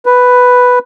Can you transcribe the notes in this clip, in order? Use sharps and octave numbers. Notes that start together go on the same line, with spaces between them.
B4